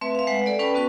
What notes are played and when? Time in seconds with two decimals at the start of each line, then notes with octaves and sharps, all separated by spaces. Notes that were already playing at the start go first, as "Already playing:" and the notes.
0.01 A3 C4 B4 E5
0.15 E5 F5
0.27 G#3 B4 F#5
0.46 A4 D5
0.59 C#4 B4 G5 A5 B5 C#6
0.74 B3 F#4 B4 C#6